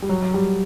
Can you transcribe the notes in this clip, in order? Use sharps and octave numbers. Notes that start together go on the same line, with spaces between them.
G3
F#3
F#3
G3